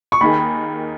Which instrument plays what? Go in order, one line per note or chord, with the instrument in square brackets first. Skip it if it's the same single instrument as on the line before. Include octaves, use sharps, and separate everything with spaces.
[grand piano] C#6
[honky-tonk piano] D#2 D#3 A#3 D#4 G#4 [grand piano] B5